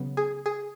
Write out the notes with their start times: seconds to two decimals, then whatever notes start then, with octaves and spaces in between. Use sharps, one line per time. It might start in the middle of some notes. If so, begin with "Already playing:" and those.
Already playing: C#3 F#3 B3
0.17 G#4
0.46 G#4